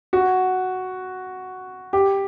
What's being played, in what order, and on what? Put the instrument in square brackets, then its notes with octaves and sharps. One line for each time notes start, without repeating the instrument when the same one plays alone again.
[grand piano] F#4
G4